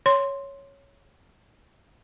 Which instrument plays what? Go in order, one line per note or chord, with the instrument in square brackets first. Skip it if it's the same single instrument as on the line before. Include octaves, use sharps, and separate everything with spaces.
[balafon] C#5 C6